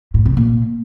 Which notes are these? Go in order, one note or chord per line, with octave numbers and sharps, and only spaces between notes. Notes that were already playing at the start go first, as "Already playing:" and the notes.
A2
C3
A#2